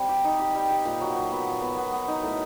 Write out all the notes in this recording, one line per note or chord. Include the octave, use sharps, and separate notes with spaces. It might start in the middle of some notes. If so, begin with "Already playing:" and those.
Already playing: G3 C4
G4
D#4
G4
G3
G4
A#2
F#3
F#3
B3
A#2
B3
B3
B3
D#4
A2